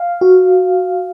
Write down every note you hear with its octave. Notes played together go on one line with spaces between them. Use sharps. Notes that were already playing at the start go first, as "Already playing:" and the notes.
Already playing: F5
F#4